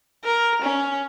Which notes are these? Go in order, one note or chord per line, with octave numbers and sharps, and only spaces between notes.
A#4
C#4